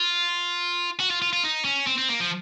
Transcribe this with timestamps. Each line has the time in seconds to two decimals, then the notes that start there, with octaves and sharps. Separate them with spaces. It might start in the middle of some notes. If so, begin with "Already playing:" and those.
Already playing: F4
1.00 F#4
1.10 F4
1.22 F4
1.33 F4
1.44 D#4
1.65 C#4
1.87 C4
1.98 C4
2.09 A#3
2.20 F3